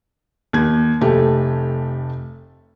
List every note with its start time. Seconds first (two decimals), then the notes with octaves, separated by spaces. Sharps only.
0.53 D#2 G#6
1.01 F1 A3 G4